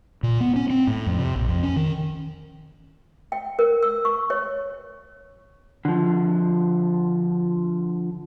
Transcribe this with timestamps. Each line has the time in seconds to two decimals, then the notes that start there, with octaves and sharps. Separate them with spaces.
0.23 A#2
0.40 B3
0.56 C#4
0.70 C4
0.87 A2
1.06 F2
1.19 C3
1.36 A#1
1.48 F2
1.63 C#4
1.76 D#3
3.32 G5
3.59 A#4
3.83 E6
4.05 C#6
4.30 C#5
5.85 D3 F3